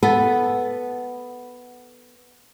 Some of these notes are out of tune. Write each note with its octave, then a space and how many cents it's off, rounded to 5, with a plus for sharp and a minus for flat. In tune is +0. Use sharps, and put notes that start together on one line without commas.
B3 +0 A4 -5